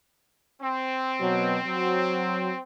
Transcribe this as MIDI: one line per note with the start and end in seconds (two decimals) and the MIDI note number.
0.62 2.62 60
1.20 1.57 47
1.20 1.57 54
1.65 2.51 54